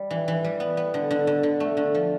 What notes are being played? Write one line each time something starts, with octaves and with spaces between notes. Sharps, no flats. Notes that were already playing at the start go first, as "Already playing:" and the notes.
Already playing: G3
E3
E3
G3
B3
B3
D3
D3
D3
D3
A3
D3
F3